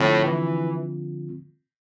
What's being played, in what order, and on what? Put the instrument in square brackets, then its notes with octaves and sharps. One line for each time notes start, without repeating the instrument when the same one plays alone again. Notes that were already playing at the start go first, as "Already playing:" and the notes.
Already playing: [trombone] A2 [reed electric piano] D3 F3 C4 F4
[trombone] E3